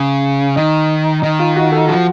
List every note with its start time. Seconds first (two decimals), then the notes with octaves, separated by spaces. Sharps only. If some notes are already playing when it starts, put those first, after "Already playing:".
Already playing: C#3
0.56 D#3 D#4
1.22 D#3 D#4
1.39 F4
1.56 F#4
1.72 A4
1.88 F3 F#4